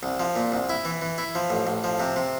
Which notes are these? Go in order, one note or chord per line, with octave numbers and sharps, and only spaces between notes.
C2
F3
A#2
C2
E4
E3
E3
E4
F3
A1
A1
F3
C3
C3